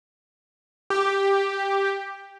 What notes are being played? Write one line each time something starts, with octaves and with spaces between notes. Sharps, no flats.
G4